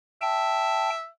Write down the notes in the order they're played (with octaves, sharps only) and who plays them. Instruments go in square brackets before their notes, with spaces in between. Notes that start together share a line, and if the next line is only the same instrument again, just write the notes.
[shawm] E5 [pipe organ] G5 A5